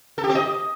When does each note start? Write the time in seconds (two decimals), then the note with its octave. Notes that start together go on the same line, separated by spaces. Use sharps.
0.18 A4
0.24 G4
0.29 C4
0.35 D#5